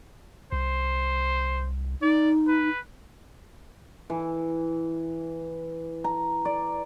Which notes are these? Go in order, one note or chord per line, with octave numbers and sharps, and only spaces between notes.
C2 C5
D#4 D5
B4
E3
A#5
D5